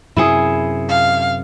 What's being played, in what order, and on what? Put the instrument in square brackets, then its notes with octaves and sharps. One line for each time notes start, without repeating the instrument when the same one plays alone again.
[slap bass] F#2 C3 [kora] E4 G#4
[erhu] F5